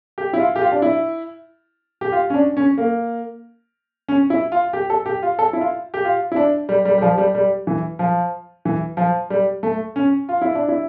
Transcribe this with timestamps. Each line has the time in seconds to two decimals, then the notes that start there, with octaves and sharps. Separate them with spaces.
0.18 G4
0.33 E4
0.39 F4
0.56 G4
0.61 F4
0.72 D4
0.82 E4
2.01 G4
2.12 F4
2.30 C#4
2.34 D4
2.57 C#4
2.78 A#3
4.08 C#4
4.30 E4
4.52 F4
4.73 G4
4.90 A4
5.06 G4
5.22 F4
5.39 A4
5.53 E4
5.60 F4
5.94 G4
6.05 F4
6.32 E4
6.36 D4
6.69 G3
6.85 G3
6.98 G3
7.02 F3
7.18 G3
7.35 G3
7.67 E3
7.99 F3
8.65 E3
8.97 F3
9.30 G3
9.63 A3
9.96 C#4
10.29 F4
10.42 E4
10.55 D4
10.68 E4